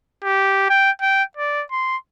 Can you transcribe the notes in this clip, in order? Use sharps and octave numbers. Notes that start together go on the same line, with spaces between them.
G4
G5
G5
D5
C6